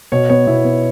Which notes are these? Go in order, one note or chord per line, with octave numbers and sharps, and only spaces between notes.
B2 C#5
B3 C#5
B2 E4
B3